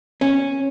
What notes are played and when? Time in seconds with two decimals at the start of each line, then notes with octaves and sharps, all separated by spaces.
0.21 C#4